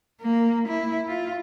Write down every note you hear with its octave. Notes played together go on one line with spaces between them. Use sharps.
A#3
E4
F4